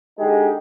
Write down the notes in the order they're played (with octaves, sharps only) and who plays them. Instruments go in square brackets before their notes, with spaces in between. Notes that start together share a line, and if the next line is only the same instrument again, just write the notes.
[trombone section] D3 G#3 D#4 G4